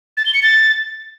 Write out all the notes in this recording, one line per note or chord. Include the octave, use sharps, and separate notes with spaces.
A6
G7
C#7
A6